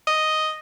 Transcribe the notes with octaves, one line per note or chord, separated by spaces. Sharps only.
D#5